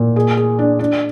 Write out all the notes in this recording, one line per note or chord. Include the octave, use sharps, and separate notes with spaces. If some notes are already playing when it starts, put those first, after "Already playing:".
Already playing: A#2
G#4
G#4
D4
D4